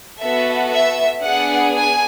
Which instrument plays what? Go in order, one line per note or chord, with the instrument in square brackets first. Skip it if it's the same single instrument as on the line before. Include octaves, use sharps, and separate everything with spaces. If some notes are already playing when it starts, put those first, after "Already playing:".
[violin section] B3 F#4 A4 E5
E5
B3 D4 G#4 F#5
G#5